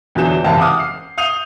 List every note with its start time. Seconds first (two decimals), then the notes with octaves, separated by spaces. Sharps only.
0.15 E2 D3 E3 F#3 G6 E7
0.44 F#1 G#2 C3 E3 F5 A5
0.59 F#5 D6 D#6 F6
0.79 C7
1.18 D#6 G6 C7 D#7 F7